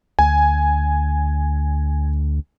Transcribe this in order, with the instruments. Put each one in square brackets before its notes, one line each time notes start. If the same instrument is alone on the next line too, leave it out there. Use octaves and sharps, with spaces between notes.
[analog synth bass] D2 [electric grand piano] G#5